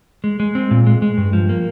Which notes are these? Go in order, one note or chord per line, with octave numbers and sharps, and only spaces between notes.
G#3
G#3
C4
A#2
G#3
G#3
G2
F3
A#3